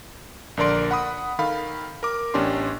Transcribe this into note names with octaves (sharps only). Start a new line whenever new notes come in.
A#1 D3 A#4 D5 C6 D7
F#5 B5 D#6
D#3 A4 F5 B5
A#4 D6
A1 B3 C#4 D4 G4 C6